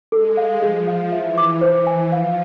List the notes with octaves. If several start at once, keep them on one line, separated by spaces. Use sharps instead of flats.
G#3 A4
F5
F3 G#4
F5
E3 E5
D6
E3 C5
G#5
F3 F5